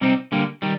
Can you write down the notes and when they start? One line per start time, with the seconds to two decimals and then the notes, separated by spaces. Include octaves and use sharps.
0.01 C3 G3 C4 D#4
0.32 D3 G3 A#3
0.62 D#3 G3